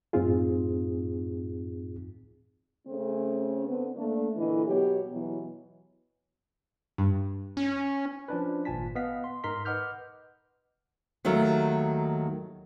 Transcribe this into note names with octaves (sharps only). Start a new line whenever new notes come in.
F#2 A2 C4 D#4 F4 G#4
C#3 A3 C4 C#4
D3 B3 C4 B4
A3 A#3 D4
A#2 D3 E3 D#5
B2 F#3 G4 C#5
B2 E3 F#3
G2
C#4
F3 C#4 D4 B4
G#1 A#2 F4 G#5 A5 B6
B3 D#5 F5 B6
C6
G#2 D#4 A#4 A#5 C6 B6
B4 D#5 F#5 D6 F6 G6
D#2 D#3 F#3 A3